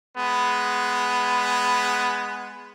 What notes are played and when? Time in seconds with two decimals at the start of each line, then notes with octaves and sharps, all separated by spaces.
0.17 G#3 B3